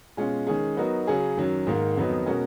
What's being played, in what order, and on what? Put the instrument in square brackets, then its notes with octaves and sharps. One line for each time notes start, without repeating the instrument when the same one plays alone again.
[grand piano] B2 G#3 C#4 F4 G#4
D#3 G#3 C#4 G#4
F#3 B3 D#4 F#4 A#4
C#3 F#3 C#4 G#4
F#2 D#3 F#3
G#2 D#3 A#3
F2 D#3 F#3 B3 D#4
B2 G#3 C#4 F#4 A#4